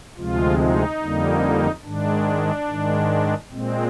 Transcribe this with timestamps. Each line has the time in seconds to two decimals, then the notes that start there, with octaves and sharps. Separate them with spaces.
0.17 D2 C3 F3 G#3 F4
0.59 D#4
1.01 F2 D3 G3 A#3
1.84 G#2 D#3 G#3 D4
2.67 G#2 D#3 G#3
3.51 A#2 G#3 C4